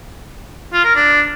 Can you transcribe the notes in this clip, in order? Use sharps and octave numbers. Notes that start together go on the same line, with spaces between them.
F4
A#4
D4